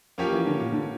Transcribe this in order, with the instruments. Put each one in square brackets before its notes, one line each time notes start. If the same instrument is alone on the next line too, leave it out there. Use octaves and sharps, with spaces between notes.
[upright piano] F3 [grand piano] A#3 C#4 G4
[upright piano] E3
D3
A#2
D3